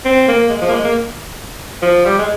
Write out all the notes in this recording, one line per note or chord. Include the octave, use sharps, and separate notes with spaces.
C4
A#3
G#3
F3
A#3
G#3
A#3
F3
G3
G#3